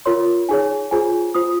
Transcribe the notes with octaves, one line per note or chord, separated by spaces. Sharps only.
F4 A#4 C#5 C6
D#4 G#4 C#5 G#5
F4 G#4 C5 G#5
F4 C5 D#6